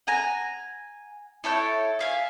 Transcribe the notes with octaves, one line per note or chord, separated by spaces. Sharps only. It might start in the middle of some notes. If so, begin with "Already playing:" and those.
F#5 G#5 A#5
E4 A4 C#5 G6
E5 F5 G#5